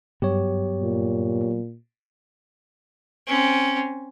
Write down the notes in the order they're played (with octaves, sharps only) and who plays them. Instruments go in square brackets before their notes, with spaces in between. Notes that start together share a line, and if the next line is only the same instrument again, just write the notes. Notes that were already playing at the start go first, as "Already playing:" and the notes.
[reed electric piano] G2 [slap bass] F#3 B3 [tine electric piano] G4 C#5
[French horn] A#2
[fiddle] C4 C#4